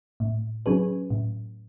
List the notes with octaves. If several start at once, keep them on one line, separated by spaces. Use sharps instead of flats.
A2
F#3 C#4 G#4 B4
A2